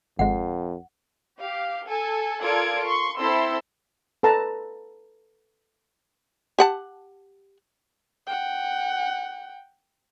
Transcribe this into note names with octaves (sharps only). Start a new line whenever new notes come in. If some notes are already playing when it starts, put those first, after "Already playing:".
G#1 F2 G#3 F#5
G4 F5
A4 G#5
F4 A4 A#4 D5 G#6 D7
C6 C#6
C4 E4 A4 C5 C6 E6
A4 B4 A5 A#5
G4 F#5 A5
F#5 G5